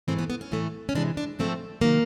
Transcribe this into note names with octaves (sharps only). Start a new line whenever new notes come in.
G#2 E3 A3 C4
B3
B3
C#4
A2 E3 A3
C#4
C3 E3 G#3 D4
D4
G#2 F3 A3 C4
C3 D#3 F#3 A#3